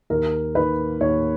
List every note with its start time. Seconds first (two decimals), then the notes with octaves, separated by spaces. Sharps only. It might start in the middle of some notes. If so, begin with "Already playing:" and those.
0.10 D#2 A#4
0.55 D#3 A#3 B4
1.01 D#2 C#5